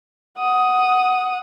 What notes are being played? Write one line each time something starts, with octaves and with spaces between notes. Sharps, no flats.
F#5 D#6